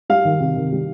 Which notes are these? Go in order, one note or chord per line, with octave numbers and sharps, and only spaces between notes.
G3 F5
D#3
C3
D#3
G3